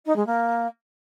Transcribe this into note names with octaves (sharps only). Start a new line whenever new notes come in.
D#4
G#3
A#3